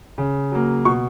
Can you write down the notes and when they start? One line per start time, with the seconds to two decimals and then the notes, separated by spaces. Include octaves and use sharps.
0.18 C#3
0.52 F#3 A#3
0.85 B2 C#6